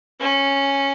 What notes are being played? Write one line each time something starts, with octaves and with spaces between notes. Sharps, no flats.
C#4